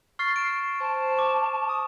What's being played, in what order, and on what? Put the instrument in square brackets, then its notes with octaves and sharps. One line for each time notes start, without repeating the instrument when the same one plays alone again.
[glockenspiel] C#6 F6 A6 [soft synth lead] C7
[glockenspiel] D7 E7
[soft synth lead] C5 [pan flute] A5
[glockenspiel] C#6 D6
[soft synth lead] D#6